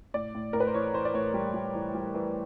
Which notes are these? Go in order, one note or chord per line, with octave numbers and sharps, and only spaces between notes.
A2 D5
A2
A2 A#4
B4
C5
E3 C#5
E3 C5
D5
A2 C#5
G3
G3
E3
G3
E3